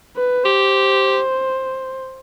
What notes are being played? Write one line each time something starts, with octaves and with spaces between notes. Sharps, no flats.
B4
G4 C5